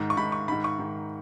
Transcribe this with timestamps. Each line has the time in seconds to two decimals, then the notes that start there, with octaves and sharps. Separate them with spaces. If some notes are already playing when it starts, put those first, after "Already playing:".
Already playing: G#2 D#3
0.10 C#6
0.17 G#2 D#3 B5
0.32 C#6
0.48 G#2 D#3 B5
0.64 C#6
0.79 G#2 D#3